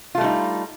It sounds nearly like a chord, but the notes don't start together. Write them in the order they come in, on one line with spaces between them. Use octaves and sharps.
F4 A3 G3 D#4